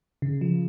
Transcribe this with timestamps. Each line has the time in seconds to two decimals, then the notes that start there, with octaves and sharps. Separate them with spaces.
0.22 C#3
0.41 F3